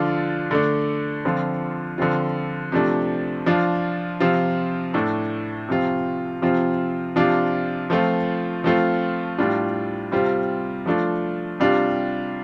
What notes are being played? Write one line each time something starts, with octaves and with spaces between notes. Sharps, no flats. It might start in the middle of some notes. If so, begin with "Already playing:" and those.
Already playing: D3 F3 D4 F4
D3 A3 D4
D3 F3 C4 F4
D3 F3 C4 F4
C3 F3 A3 D4
F3 D4 F4
C3 F3 C4 F4
A2 A3 D4
C3 F3 C4 F4
C3 F3 C4 F4
C3 F3 D4 F4
F3 A3 C4 F4
F3 A3 C4 F4
A2 G3 D4 F4
C3 G3 C4 F4
F3 A3 D4 F4
C3 G3 D4 F4